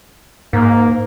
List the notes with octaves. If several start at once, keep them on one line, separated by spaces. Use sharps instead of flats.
G#2 A#3